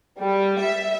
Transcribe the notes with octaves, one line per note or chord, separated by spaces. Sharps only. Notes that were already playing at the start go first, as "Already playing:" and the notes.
G3
E5